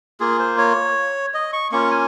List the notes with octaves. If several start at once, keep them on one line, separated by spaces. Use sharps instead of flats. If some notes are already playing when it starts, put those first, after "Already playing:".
A#3 F4 G#4
C5
C#5
D#5
C#6
A#3 C#4 F4 C#6
G#5